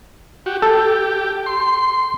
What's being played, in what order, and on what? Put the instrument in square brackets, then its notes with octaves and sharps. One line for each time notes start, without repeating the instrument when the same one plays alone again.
[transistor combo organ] F#4 G4
[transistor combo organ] G4 [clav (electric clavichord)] A4
[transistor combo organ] C6